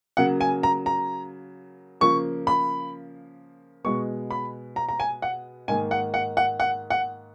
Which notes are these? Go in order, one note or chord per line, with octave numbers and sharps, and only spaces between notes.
C#3 F#3 A#3 F#5
G#5
A#5
A#5
C#3 F3 A#3 C#6
B5
B2 G#3 B3 C#6
B5
A#5
A#5
G#5
F#5
G#2 D#3 A#3 G#5
F#5
F#5
F#5
F#5
F#5